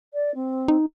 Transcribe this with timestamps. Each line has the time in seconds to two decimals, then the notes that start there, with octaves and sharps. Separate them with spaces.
0.13 D5
0.34 C4
0.68 D#4